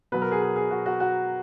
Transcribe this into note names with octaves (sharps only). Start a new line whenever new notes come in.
B2 F#3 B4
A#4
G#4
G#4
G#4
F#4
F#4
F#4